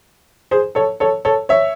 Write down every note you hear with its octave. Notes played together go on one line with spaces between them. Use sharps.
G#4 C5
A4 C#5
A4 C#5
A4 C#5
C#5 E5